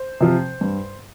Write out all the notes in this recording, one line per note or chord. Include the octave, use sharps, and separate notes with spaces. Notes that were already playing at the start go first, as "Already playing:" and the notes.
Already playing: C5
C3 F3
G2